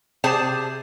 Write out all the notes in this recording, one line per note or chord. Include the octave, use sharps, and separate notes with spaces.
C3 G#4 C5 A5